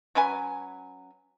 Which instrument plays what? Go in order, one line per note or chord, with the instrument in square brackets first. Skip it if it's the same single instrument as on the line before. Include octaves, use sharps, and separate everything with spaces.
[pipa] F#3 C#4 B4 G#5